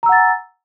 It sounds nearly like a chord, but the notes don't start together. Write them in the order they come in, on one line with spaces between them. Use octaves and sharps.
A#5 E6 F#5 A6 G#5